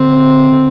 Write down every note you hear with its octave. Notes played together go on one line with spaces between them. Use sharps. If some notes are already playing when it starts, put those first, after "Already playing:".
Already playing: D3 C4
D3